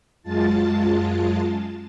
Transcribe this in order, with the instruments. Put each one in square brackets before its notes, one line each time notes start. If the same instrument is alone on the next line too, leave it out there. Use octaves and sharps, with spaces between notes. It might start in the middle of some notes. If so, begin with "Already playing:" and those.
[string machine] F#2 G#3 F4 A5 A6